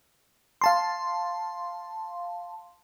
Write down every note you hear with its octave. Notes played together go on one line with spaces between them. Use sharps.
F5 A5 C6